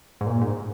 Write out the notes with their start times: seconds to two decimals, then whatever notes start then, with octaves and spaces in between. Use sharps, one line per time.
0.21 G#2
0.26 A#2
0.41 G#2